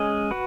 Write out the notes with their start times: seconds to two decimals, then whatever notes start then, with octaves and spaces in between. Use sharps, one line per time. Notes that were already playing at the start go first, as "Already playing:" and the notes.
Already playing: G#3 C#4 G#4 D#5
0.31 F#4 B4